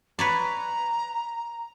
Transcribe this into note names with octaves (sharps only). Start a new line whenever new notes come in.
B4 C#5 D5 A#5